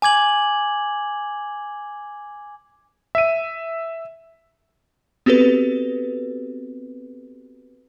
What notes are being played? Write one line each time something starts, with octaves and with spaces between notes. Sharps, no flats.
G#5 D6 G#6 F#7
E5 D#7
B3 C4 F#4 G4 A4 B4